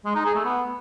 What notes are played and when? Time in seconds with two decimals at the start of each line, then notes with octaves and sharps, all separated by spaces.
0.05 G#3
0.15 D#4
0.25 G#4
0.35 A3
0.45 B3